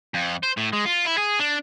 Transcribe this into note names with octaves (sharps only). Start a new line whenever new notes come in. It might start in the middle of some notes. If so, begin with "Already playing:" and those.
F2
C5
A2
G#3
F4
E4
G#4
D4